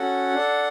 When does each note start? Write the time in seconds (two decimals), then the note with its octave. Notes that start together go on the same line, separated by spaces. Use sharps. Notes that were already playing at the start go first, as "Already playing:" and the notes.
Already playing: C#4 F#4 A4 F#5
0.35 D4 A4